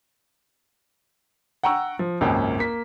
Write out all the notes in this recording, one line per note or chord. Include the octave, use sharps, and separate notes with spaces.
F#5 G5 A#5 C#6 E6
F3
G#1 C#2 F#2 A#3 C#4 G5
A#3 B6